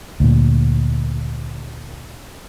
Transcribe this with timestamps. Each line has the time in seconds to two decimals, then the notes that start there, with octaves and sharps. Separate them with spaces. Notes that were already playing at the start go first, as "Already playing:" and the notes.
0.20 D2 A#2